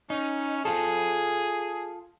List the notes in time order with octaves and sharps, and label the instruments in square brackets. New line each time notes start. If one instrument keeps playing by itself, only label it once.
[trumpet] C#4 [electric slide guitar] D#4
[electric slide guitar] F4 A4 [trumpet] G#4